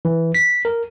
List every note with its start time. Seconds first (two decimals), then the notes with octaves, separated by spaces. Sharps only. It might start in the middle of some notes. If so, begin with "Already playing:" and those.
0.05 E3
0.35 B6
0.65 A#4